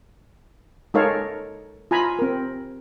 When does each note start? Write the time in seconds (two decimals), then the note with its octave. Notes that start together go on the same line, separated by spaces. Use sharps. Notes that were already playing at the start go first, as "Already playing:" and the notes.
0.94 G#3 D#4 A4 A#4 C#5 F5
1.91 F4 G#5 A#5 B5
2.19 C4 A#4